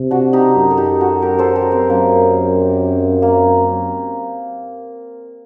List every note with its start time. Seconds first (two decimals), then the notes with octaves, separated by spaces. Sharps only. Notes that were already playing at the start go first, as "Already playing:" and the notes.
Already playing: C3
0.11 D4 F#4
0.33 D#4 G4
0.56 F#2
0.71 A4
0.77 D#4 G4
1.01 F#4 A4
1.22 G4 A#4
1.38 A4 C5
1.55 G4 A#4
1.72 C4
1.89 F#2 A#3
3.22 A#3